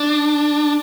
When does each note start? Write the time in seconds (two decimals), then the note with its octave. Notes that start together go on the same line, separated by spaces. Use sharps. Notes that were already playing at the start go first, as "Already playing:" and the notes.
Already playing: D4